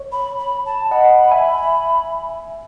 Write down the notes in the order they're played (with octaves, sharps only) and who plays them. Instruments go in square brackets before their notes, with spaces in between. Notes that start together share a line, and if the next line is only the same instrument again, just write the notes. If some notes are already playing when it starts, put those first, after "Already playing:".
Already playing: [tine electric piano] C#5
[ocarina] B5
B5
A5
[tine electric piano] D#5 F#5 [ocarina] B5
[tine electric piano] E5 G#5